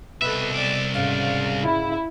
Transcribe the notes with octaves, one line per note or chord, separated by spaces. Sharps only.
C2 B2 A4 B4 E5
D5 D6
D2 G#2 C#3 D5 F5
E4